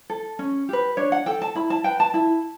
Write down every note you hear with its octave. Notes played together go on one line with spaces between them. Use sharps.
A4
C#4
G4 B4
D4 C#5
F#5
A4 G5
A5
E4 B5
A5
B4 G5
A5
E4